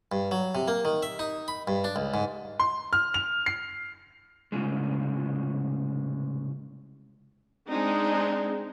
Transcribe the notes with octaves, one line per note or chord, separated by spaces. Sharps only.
G2
F#3
C3
A#3
D#3
E5
D#4
B5
G2
D4
C#2
G#2
C6
F6
F7
C7
C2 F#2 A2 C#3 G#3
G#3 C4 D4 D#4